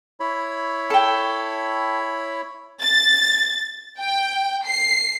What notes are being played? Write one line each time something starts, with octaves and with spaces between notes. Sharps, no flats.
E4 C#5 B5
A4 G5
A6
G5
C7